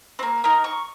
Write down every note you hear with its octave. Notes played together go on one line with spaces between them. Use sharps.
A#3 C4
D#4 A#4
C#6